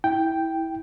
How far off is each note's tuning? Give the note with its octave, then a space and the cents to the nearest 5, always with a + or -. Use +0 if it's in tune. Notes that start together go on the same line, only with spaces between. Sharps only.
E4 -15 G5 +0